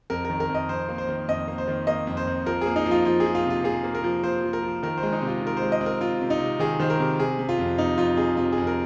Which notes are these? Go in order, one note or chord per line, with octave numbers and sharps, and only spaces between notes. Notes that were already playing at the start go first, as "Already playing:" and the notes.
F2 A#4
A#4
D#3
A#4
F2
D#5
F2 C5
A#3
C5
D#3
F2 D#5
A#3
C5
D#3
A#3 D#5
F2
C5
F2
F3 A#4
A#3 G#4
D#4
F3
F4
F3 F4
G#4
F3
F4
C3 F4
A#3 G#4
A#3
A#4
F3
A#3 C5
F3
A#4
F3
D#3 A#4
C5
G#3
D#4
C3
F4
D#3
A#4
G#3 C5
D#5
C4
A#4
C4 F4
C3
D#4
C3
D#3 G#4
D#3 C5
A#4
C3
C3 G#4
C3
F4
F2
F2 D#4
F2 F4
C3 G#4
C3 F4
G#4
F2
A#4